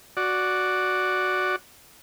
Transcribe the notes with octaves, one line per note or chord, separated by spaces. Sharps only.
F#4 D5